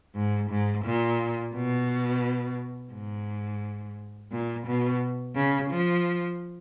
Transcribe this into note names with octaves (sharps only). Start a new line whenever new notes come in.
G#2
G#2
A#2
B2
G#2
A#2
B2
C#3
F3